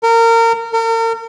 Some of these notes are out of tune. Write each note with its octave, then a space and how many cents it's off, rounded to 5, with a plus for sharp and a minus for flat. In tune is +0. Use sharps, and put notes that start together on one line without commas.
A#4 -25
A#4 -40